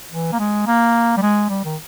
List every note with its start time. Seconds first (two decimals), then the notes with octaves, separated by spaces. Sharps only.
0.12 E3
0.33 A#3
0.39 G#3
0.67 A#3
1.17 G3
1.22 G#3
1.50 G3
1.64 D#3